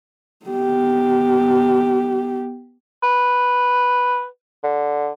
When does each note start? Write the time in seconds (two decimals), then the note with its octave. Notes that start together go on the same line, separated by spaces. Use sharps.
0.46 B3 G4
3.03 B4
4.64 D3